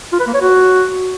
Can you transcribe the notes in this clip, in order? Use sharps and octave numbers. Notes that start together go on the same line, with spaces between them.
F4
B4
A#3
C#5
F#4